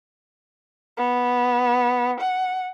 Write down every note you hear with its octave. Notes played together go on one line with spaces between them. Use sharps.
B3
F#5